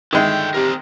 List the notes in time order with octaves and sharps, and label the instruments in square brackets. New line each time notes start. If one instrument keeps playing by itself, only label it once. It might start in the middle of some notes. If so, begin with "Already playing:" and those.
[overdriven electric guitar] D3 G5 [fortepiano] D#3 G#3 E4
[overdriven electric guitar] C4 A#4 [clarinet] G4